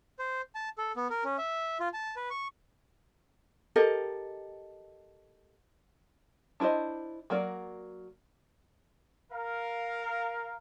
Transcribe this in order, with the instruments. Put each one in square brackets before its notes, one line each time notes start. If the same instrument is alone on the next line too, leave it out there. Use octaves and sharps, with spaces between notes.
[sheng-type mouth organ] C5
A5
A4
B3
A#4
C#4
E5
F4
A5
B4
C#6
[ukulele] G4 A4 A#4 D#5
[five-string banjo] D4 E4 B4 C5 D#5
F#3 A#3 A#4 D5
[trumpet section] A#4 F5